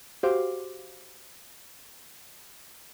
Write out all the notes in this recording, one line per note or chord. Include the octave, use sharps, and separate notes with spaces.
F#4 G4 C5 F5 C6 D6